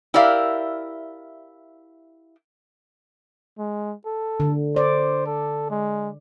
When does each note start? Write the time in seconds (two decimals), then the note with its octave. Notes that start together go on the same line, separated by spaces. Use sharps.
0.14 E4 G4 A#4 D5 E5 F5
3.58 G#3
4.06 A4
4.40 D3
4.76 C5 D5
5.26 A4
5.70 G#3